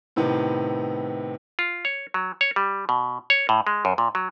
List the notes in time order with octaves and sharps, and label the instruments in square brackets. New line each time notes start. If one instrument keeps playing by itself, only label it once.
[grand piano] A2 C3 D#3 B3
[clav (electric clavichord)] F4
C#5
F#3
C#5
G3
B2
C#5
A2
G#3
F#2
A#2
F#3